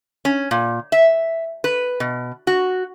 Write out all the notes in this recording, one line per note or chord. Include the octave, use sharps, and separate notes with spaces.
C#4
A#2
E5
B4
B2
F#4